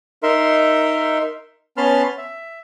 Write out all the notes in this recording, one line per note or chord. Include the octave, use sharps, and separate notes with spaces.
D#4 A#4 E5 C6
B3 C#4 A5 B5 C6 F6
E5